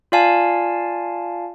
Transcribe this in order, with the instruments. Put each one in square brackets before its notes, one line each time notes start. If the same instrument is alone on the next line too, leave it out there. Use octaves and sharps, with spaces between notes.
[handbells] F4 D5 F5 G#5 A5